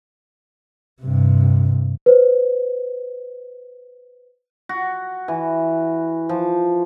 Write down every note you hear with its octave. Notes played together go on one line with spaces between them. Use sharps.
G2 C3
B4 C5
F#4
E3
F3